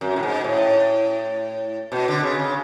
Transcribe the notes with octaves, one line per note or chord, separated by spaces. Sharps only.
F#2
A2
G#2
A2
B2
D3
C#3
C#3